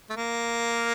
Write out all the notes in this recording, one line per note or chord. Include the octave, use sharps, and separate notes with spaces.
A3
A#3